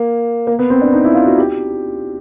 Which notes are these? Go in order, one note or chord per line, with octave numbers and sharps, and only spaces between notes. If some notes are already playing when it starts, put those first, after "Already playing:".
Already playing: A#3
A#3
B3
C4
D4
D#4
E4
F4
F#4
G4